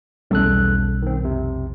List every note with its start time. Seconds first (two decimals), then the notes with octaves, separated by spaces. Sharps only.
0.31 B1 E2 G3 C#4 A4 F#6
1.02 D#3 C4
1.22 F2 C3